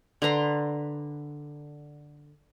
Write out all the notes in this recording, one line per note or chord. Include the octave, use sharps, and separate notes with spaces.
D3 B4 A#5 C6